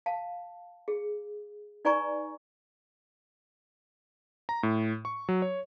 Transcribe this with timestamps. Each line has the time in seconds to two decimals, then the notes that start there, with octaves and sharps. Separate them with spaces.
0.06 F5 A5
0.88 G#4
1.85 D#4 B4 D5 G#5 A#5 C#6
4.49 A#5
4.63 A2
5.05 C#6
5.29 F#3
5.42 C#5